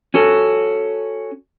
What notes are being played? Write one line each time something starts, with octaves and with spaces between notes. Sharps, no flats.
C#4 F#4 A4